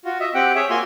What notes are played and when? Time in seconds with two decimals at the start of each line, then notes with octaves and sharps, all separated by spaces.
0.05 F4 F#4
0.20 D#5 E5
0.34 C4 G4 F#5 G5
0.55 G#4 C#5 E5
0.70 A#3 F4 F#4 G#5 C6